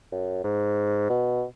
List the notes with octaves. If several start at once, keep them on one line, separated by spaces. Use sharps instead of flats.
F#2
G#2
B2